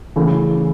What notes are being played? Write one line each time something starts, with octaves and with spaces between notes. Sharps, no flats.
C#3 E3 A3